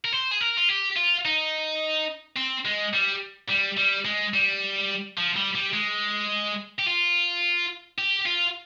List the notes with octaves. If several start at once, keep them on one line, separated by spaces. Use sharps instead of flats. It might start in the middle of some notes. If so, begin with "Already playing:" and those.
A#4
C5
G#4
A#4
F4
G4
F4
D#4
C4
G#3
G3
G3
G3
G#3
G3
F3
G3
G3
G#3
G4
F4
G4
F4